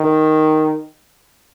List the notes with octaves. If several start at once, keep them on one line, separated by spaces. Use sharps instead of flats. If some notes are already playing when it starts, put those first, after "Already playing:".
Already playing: D#3